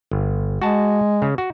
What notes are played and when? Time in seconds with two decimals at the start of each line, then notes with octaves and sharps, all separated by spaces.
0.11 G1
0.62 G#3 F#4 A5
1.22 C#3
1.38 F#4